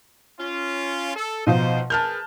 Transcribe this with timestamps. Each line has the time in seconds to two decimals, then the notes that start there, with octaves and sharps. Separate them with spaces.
0.39 C#4 F4
1.16 A4
1.47 B2 F3 D#4 C5
1.90 G#4 A#4 B4 A5 F6 G6